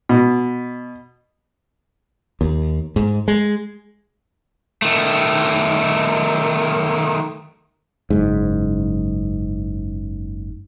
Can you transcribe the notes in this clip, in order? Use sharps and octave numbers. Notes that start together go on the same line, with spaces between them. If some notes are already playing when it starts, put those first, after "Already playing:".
B2
D#2
G#2
G#3
D#3 A3
F#1 G#2